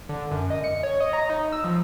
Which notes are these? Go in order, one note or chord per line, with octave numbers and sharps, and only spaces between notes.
D3
F#2
D#5
C#7
C#5
D#5
A#5
D#4
E6
F3